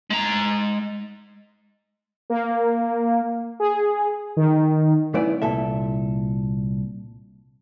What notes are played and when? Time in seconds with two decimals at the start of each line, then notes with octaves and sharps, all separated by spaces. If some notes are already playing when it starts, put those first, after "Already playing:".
0.11 G#3 A#5
2.30 A#3
3.60 G#4
4.37 D#3
5.14 E3 A3 B3 C#4 E4 D5
5.42 C2 A#2 A4 E5